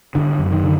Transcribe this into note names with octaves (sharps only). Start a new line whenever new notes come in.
G#1 D3
F#2
D#3
D3